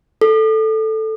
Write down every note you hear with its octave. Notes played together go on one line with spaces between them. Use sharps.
A4